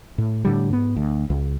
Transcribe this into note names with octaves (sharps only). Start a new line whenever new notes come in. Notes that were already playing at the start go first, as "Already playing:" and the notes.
A2
A2 D3 G3
G#2 B3
D2
C#2